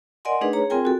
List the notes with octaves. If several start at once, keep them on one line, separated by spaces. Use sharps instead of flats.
A#4 D5 D#5 F#5 G#5 C6
A3 D4 D#4 G#4 B4
G#4 C#5 A#5
C4 F4 G#4 A#4 G5 G#5
F#4 A4